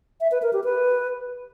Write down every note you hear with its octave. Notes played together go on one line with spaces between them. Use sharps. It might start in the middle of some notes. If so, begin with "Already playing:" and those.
E5
B4
A#4
G4
B4